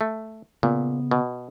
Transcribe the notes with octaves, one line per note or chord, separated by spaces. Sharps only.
A3
A#2 C#3 B3
B2